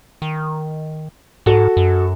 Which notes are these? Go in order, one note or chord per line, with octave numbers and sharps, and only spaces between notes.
D#3
G#2 F#4 A4
F#2